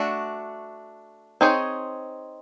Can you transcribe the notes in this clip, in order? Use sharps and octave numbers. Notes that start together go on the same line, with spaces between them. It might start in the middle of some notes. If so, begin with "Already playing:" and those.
Already playing: A3 D4 F#4
C4 D#4 G#4 C#5